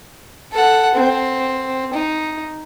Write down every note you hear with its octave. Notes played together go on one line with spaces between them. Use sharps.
A4 F#5
C4
D#4